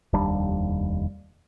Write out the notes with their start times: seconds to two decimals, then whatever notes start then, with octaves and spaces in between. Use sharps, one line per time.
0.13 F1 D#2 G3 D4